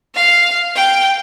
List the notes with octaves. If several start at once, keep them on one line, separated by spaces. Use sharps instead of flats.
F5
G5